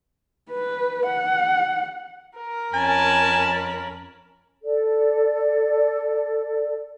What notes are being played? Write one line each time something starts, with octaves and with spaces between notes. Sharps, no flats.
B4
F#5
A#4
F2 C#4 G#5 A5 B5
A4 D5